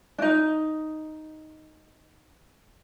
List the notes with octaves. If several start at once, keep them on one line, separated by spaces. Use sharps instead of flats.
D4 D#4